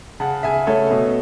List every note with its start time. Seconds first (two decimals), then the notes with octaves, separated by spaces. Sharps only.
0.20 C#3 F#5 A5
0.43 C#3 E5 G#5
0.67 A3 A4 C#5
0.90 B2